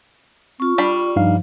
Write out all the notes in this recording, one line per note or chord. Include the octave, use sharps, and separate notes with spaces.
C4 F4 C#6
G3 D4 D5 B5
G2 F3 D#4 F5